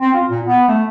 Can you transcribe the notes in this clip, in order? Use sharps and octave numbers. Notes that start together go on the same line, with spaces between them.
C4
F4
A#2
B3
A3